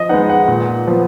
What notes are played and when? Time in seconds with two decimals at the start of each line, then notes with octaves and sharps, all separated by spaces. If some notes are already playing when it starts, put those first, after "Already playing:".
Already playing: F3 D#5
0.09 G#3 B3 D#4 F#5
0.29 F#5
0.48 A#2
0.87 F3 B3